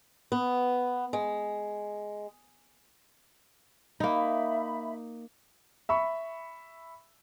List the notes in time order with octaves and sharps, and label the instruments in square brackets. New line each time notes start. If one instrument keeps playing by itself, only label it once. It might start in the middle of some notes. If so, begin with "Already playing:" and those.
[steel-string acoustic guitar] B3
G#3
[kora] A#3 D#4 [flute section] E5 B5
[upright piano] E5 B5 C#6